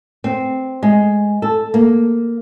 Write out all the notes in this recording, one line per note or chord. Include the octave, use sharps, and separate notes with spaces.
C4
G#3
A4
A#3